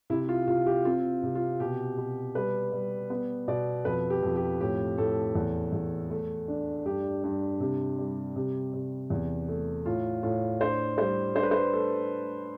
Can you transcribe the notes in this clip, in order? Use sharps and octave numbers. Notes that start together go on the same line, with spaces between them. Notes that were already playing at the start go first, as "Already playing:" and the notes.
C3 E4
F4
C3 F4
G4
C4 F4
C3
F4
B2 G4
B2
G3 B4
G3
B3
B2 D5
F2 B4
G4
F2
G4
A2 G4
A2 A4
E2
E2
A3
D4
G2 G4
G2
C3
G3
C3
C3
E2
A3
A2 F4
A2 F4
D4 C5
G3 C5
D4 C5
B4
C5
A3 A4